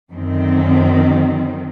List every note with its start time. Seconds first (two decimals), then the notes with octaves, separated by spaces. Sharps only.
0.11 F#2 D3 D#3 C4